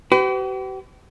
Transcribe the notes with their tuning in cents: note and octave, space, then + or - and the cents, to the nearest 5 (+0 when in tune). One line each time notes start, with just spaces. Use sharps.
G4 -45 B4 +40